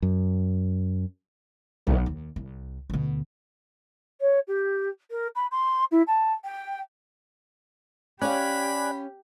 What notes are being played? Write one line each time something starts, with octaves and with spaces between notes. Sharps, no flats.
F#2
B1
D#2
C2
D2 B2
C#5
G4
A#4
B5
C6
E4
A5
G5
C#4 G4 D5 F5 G#5 B5 F#6